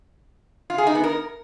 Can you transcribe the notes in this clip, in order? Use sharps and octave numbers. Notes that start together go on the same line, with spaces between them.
F4
G#4
D#4
B3
A#4